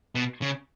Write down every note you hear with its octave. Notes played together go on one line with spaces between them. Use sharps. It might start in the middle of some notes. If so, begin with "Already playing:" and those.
B2
C#3